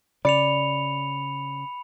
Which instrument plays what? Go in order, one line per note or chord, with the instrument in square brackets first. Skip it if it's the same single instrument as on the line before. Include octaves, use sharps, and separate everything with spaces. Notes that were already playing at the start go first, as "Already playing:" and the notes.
[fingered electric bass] C#3 [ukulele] D5 [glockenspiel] B5 C#7 F7